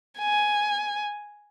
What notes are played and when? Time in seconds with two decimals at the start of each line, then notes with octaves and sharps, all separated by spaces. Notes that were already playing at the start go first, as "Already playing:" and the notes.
0.18 G#5